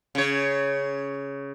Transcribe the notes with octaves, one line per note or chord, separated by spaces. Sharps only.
C#3 C#5